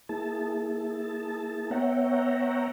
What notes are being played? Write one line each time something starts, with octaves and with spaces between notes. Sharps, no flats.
A#3 E4 G#4 A5
B3 C#5 E5 F#5 G5 A#5